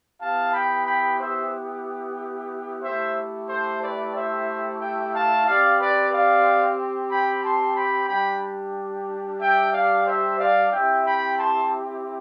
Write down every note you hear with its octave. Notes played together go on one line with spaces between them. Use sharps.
B3 E4 G4 F5 A5
G5 B5
G5 B5
C5 E5
A3 E4 G4 C5 E5
A4 C5
B4 D5
C5 E5
E5 G5
F5 A5
C4 G4 D5 F5
B4 D5
D5 F5
G5 B5
A5 C6
G5 B5
G3 D4 G4 G5 B5
E5 G5
D5 F5
C5 E5
D5 F5
C4 E4 G4 E5 G5
G5 B5
A5 C6